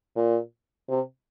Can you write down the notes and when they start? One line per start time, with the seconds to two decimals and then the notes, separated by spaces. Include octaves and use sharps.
0.16 A#2
0.89 C3